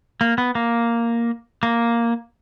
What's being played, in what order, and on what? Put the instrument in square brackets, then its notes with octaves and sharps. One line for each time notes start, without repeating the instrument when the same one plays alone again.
[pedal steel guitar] A#3
B3
A#3
A#3